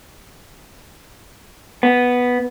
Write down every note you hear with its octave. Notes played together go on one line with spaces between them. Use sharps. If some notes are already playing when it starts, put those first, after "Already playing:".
B3